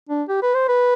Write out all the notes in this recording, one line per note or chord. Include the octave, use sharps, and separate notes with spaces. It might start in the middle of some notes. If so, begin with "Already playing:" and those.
D4
G4
B4
C5
B4